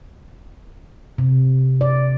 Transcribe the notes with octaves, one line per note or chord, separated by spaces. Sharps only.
C3
D5